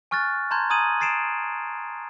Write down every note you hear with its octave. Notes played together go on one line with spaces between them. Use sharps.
G#5 C#6 F6 F#6 A6
A5 A#5 C6 G6 G#6
G#5 A#5 D#6 G#6 D#7 F#7
D#6 A6 C7 D7 E7